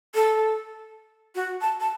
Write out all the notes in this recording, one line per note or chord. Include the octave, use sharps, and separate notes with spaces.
A4
F#4
A5
A5